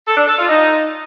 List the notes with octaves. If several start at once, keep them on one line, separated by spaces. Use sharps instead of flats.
A4
D4
A4
F4
D#4